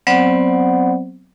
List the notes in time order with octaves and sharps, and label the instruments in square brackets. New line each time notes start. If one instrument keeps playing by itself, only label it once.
[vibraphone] F#3 B3 C4 C5 D5 F#5